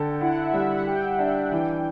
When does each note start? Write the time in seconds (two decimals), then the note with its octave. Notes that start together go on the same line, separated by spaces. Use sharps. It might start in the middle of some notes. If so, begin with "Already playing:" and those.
Already playing: D3 A4 G5
0.21 E4 F#5
0.37 E5
0.53 G3 E5
0.70 F#5
0.86 G4 G5
1.19 D4 G5
1.43 F#5
1.52 E3 G5